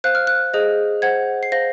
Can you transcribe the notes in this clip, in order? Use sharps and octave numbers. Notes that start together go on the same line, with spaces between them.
C5 F5 F#6
F6
F#6
G#4 C5 D#5
C5 F#5 G#6
C7
C5 F5 A#6